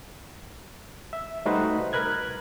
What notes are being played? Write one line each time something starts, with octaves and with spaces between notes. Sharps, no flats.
E5
G3 A3 D#4 F#4 B4 C5
A#4 B4 F#6 G#6